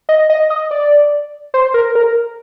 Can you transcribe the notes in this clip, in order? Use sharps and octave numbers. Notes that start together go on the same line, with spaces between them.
D#5
D#5
D#5
D5
C5
A#4
A#4